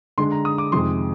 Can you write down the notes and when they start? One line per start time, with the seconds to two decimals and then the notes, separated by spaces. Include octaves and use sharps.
0.18 D3 G#3 D4 C6
0.32 A#5
0.45 D#6
0.58 D6
0.72 F2 C3 D#3 G#3 C6